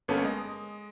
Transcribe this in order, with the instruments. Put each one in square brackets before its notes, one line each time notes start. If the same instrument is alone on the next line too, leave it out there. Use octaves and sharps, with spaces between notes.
[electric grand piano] G1 C#4 [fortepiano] A#3 B3 A4
[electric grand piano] G#3 [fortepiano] D#5